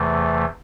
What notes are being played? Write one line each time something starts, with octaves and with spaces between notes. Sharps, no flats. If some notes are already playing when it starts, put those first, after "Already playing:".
Already playing: E2 C3 E3 A3